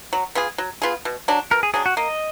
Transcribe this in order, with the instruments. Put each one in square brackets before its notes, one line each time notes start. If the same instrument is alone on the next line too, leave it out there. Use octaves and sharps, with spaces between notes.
[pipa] F#3
B3 F4 G#4
F#3
B3 F4 G#4
B2
F#3 D4
[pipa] B2 [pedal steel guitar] A#4
[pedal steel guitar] G#4
[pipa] F#3 D4 [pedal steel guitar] G#4
[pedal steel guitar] F#4
[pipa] A#3 [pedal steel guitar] D#5